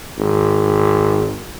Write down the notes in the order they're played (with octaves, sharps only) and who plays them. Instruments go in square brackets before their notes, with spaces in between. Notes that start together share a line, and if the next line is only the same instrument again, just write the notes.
[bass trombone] G#1